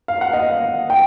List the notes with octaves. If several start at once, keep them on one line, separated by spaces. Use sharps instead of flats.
F5
F#5
D#5 F5
G5